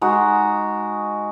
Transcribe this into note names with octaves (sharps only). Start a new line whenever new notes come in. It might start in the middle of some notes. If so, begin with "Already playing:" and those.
G#3 D#4 F#4